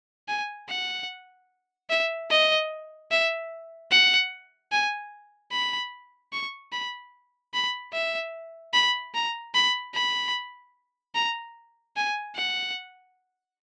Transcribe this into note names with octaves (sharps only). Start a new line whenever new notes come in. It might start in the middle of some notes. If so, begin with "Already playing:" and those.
G#5
F#5
E5
D#5
E5
F#5
G#5
B5
C#6
B5
B5
E5
B5
A#5
B5
B5
A#5
G#5
F#5